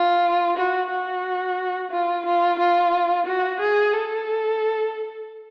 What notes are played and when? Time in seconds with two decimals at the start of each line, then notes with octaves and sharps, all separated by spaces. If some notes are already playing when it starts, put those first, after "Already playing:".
Already playing: F4
0.57 F#4
0.90 F#4
1.91 F4
2.25 F4
2.59 F4
3.26 F#4
3.60 G#4
3.93 A4